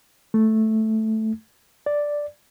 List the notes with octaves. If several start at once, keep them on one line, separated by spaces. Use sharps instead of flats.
A3
D5